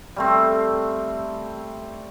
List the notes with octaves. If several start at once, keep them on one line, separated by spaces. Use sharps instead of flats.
G3 A3 C4